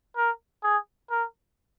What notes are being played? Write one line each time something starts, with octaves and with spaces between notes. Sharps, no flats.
A#4
G#4
A#4